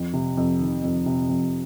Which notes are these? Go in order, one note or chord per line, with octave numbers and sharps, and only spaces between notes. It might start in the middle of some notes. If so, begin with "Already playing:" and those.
Already playing: F2
C3
F2
D#3
F2
C3
F2